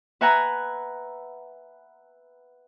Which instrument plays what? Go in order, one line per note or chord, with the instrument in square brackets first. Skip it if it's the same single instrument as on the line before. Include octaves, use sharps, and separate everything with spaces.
[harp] B4 E5 F#5 G#5 A#5